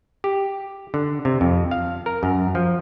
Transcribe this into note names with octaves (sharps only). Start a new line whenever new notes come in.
G4
D3
C3
F2
F5
A#4
F#2
F3